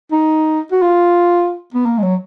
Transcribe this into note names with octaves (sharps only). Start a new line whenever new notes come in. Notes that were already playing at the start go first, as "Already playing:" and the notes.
D#4
F#4
F4
B3
A#3
G#3
F#3